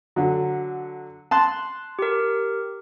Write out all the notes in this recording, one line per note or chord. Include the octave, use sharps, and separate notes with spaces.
D3 F#3
A5 C6 F#6
G4 A#4